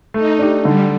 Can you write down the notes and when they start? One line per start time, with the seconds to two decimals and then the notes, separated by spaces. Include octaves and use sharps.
0.14 A3 D#4
0.39 D4 G4
0.65 D3 G3